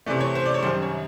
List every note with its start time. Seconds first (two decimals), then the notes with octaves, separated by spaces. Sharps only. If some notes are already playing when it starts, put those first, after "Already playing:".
0.06 C3 E3 A3 D5
0.21 C#5
0.35 C5
0.46 D5
0.54 C#5
0.63 F#2 D#3 G3 C5
0.82 C#5